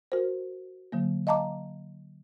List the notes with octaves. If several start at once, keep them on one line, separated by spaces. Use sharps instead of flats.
F#4 A#4 C5
D3 F#3 A#3
D#5 F5 A5 A#5 D6